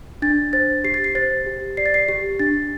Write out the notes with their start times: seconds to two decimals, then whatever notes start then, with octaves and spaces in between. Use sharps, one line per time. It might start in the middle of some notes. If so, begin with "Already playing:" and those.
0.22 D4 A6
0.53 C5 A6
0.84 G4 C7
0.94 A6
1.04 C7
1.15 C5 A6
1.46 G4
1.77 D5 C7
1.86 A6
1.94 C7
2.09 G4 C7
2.39 D4 A6